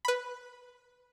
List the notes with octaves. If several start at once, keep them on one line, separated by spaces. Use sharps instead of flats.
B4 B5